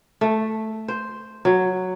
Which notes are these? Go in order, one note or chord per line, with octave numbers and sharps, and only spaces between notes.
A3
C5
F#3